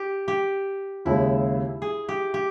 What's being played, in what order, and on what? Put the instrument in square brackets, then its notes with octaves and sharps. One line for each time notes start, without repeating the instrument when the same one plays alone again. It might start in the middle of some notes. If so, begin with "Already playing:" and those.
Already playing: [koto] G4
G4
[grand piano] D#2 C#3 G#3 [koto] E4
[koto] G#4
G4
G4